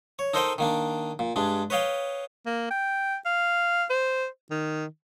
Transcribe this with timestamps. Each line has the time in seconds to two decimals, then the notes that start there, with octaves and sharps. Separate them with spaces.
0.19 C#5
0.34 D#4 A4 A#4 C5 D#5 G5
0.58 D#3 A#3 D4
1.19 A#2
1.36 G2 G#3 D4
1.70 B4 C#5 D#5 F5 G5
2.46 A#3
2.71 G5
3.26 F5
3.90 C5
4.51 D#3